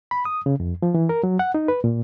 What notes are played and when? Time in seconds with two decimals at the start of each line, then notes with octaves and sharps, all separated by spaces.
0.11 B5
0.25 D#6
0.46 C#3
0.60 F2
0.82 F3
0.94 E3
1.09 A#4
1.23 F#3
1.39 F#5
1.54 D#4
1.68 B4
1.84 A#2